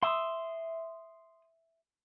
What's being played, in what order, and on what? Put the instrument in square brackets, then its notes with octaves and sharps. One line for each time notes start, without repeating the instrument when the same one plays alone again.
[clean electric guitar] E5 [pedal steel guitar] C6 D#6